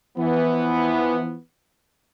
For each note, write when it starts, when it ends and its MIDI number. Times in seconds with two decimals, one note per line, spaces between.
0.18 1.37 52
0.18 1.37 53
0.18 1.37 59